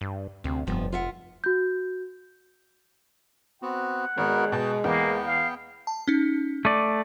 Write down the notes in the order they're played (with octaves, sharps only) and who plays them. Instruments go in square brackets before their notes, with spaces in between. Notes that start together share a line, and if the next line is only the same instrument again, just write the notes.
[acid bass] G2
[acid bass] D2 [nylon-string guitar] C3
[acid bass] F1 [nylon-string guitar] G2 F3 B3
[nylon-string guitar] F4 E5 F#5
[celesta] F#4 G6
[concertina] B3 C4 F#4 [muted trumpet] F#5
[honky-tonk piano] G#1 [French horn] G#3 [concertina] B3 F#4 A#4
[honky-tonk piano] B2 [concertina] D#5 G5 A5
[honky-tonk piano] E2 [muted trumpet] A#3 [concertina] B3 G5
[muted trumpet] F5
[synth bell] A5
C#4 D#4
[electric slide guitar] A3 D5 [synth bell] D#7